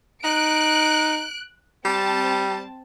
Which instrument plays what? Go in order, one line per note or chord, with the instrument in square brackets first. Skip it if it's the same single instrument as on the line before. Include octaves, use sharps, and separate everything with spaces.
[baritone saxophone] D#4 [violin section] F#6 D7
[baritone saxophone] G3 [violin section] C4 A5